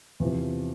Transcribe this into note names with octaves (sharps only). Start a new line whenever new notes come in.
E2 C3 F3